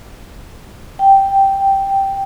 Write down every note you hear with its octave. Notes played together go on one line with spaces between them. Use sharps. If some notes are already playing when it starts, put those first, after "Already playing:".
G5